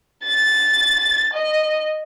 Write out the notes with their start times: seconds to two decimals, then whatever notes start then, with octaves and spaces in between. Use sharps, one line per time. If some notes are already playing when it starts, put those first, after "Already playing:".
0.25 A6
1.33 D#5